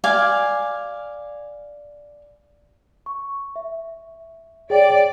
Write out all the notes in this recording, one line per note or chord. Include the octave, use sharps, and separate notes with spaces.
D5 F5 G#5
C#6
E5
G#4 C#5 D5 G5